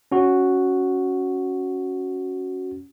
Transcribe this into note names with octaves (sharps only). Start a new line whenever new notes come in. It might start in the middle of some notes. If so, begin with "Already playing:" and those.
C#4 F#4